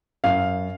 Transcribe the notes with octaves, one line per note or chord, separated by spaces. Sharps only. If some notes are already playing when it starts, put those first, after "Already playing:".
F#2 F5